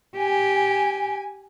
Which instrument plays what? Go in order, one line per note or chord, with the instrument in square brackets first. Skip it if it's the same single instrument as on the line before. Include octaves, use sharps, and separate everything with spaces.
[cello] G4 [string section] G#5